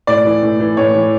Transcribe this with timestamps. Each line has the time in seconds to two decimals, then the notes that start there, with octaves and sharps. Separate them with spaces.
0.07 A2 D5
0.25 E3
0.43 A2
0.60 E3
0.77 A2 C#5
0.95 E3